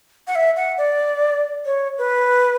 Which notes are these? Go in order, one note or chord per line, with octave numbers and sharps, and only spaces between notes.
F#5
E5
F#5
D5
C#5
B4